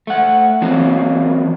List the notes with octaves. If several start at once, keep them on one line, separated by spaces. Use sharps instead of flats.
A3 F#5
E3 F#3 A#3 C4